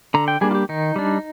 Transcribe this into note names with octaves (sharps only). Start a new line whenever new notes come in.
D3 A#5
G5
G3 A#3 D4 G#4
F4
G4
D#3 D#4
G3 D4